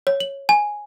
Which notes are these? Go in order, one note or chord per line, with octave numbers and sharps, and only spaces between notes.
C#5
F#7
G#5